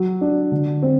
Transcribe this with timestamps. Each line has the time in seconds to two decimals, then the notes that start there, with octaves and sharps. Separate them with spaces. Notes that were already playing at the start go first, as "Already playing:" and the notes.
Already playing: F#3
0.21 D4
0.52 D3
0.82 C4